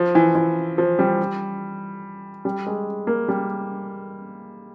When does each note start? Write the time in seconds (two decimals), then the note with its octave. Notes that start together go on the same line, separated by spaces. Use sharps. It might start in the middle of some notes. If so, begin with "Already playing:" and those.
Already playing: F3
0.15 E3
0.35 E3
0.78 F3
0.99 G3
2.45 G3
2.66 G#3
3.07 A#3
3.28 G3